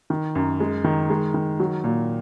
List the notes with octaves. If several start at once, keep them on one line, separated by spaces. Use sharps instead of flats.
D#3
F#2
G#3
D#3
G#3
D#3
F#3
A#2